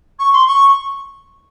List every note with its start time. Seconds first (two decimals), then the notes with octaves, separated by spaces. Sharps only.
0.19 C#6
0.33 C6
0.47 C#6